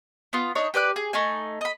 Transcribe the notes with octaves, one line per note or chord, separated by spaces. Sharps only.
B3 F4
D4 D#4 C#5
G4 B4 D5 F#6
G#4
A3 D#4 G#5
D#5 B5